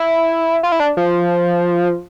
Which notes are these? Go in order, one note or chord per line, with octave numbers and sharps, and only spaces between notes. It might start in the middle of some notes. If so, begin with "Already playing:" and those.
Already playing: E4
F4
E4
D4
F3